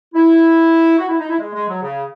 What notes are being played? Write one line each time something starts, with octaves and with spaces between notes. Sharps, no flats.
E4
F#4
E4
D#4
E4
G#3
G#3
F#3
C#3